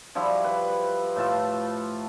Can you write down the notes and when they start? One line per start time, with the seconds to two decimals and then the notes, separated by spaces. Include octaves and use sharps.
0.15 F3 G3 E4 F#4
0.44 B4
1.16 A2 A3 F4 A5